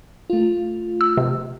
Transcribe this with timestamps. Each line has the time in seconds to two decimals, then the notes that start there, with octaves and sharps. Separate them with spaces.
0.30 A3 F4
1.01 E6
1.17 C3